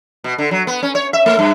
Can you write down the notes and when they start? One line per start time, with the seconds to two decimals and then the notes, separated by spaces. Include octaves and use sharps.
0.24 B2
0.38 D3
0.51 F#3
0.67 B3
0.83 C#4
0.95 C#5
1.13 E5
1.26 A3
1.39 G2